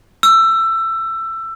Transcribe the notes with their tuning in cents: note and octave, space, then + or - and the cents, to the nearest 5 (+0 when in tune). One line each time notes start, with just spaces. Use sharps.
E6 +20